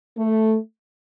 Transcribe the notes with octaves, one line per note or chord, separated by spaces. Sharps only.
A3